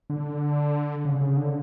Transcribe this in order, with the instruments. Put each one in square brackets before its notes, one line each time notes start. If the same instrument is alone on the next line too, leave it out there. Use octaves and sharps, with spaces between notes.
[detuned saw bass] D3
C#3
C#3
D3